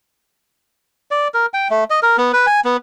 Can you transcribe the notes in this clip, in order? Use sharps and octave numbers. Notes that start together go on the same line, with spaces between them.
D5
A#4
G5
A3
D#5
A#4
B3
B4
G#5
B3